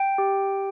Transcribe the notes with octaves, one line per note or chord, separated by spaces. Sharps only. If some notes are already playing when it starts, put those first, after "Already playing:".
Already playing: G5
G4